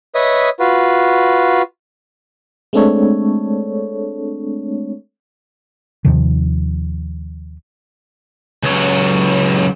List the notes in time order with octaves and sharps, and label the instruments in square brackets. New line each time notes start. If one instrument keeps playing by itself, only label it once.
[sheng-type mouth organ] B4 C#5 D#5 E5 D#6
F4 F#4 B4
[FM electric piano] G#3 A3 C4 D4 A4 C#5
[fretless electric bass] D#2 C3 D#3 F3
[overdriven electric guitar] C#2 F#3